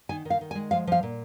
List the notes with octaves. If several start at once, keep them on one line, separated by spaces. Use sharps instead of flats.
D#3 G#5
D#3
F5
D#3
G#5
G#3
F3 F5
F3 F5
A#2